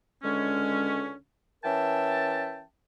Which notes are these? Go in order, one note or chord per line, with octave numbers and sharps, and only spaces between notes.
C#2 D3 G#3 C#4
E3 C#4 A#4 E5 G5 A5